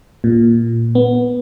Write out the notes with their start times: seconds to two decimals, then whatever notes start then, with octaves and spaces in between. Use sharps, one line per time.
0.24 A#2
0.95 B3